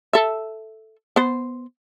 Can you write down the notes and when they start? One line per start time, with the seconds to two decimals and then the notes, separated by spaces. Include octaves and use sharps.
0.13 A4 E5
1.16 B3 C5